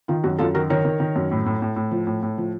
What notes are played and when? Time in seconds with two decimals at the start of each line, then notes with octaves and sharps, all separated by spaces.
0.08 D#3 F4
0.24 F#2 F#4
0.39 F#2 F4 A4
0.54 D#3 F#4 A#4
0.70 D#3 A#4 C#5
0.85 D#3
1.00 D#3
1.16 F#2
1.31 A2
1.46 A2
1.62 A2
1.76 A2
1.91 F3
2.07 A2
2.23 A2
2.38 F3